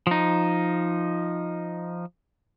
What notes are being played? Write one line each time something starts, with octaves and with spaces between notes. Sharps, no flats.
F3 D#4